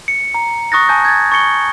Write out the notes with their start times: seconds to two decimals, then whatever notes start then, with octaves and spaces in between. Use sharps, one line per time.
0.08 C#7
0.34 A#5
0.72 C#6 D#6 F#6 A6 A#6
0.89 G#5 A5 G6
1.05 G#6 A6
1.32 C#6 A6 C#7 G7